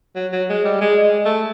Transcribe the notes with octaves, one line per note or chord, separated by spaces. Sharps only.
F#3
F#3
G#3
G3
G#3
G#3
A3